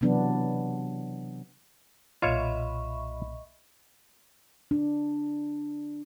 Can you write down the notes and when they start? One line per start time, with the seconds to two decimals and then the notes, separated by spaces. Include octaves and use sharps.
0.01 C3 E3 F#3 B3 D4
2.22 B1 A#2 F4 C#5 D#5 E5 B5 C#6
4.71 D4